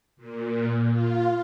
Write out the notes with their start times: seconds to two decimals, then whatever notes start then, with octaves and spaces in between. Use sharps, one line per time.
0.17 A#2
0.90 F4